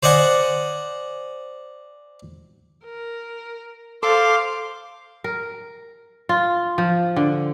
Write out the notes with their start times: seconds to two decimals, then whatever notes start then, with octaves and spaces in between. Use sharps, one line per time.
0.03 C5 D5 D#5 F#5 G#5
2.85 A#4
4.03 A4 C5 F5 C6 D6
5.24 A#4
6.29 F4
6.78 F3
7.16 D3